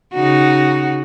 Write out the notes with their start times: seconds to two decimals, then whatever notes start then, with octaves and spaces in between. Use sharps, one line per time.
0.14 C#3 D#4 F#4